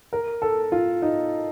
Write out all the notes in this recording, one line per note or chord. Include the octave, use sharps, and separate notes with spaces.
A#4
A4
F4
D#4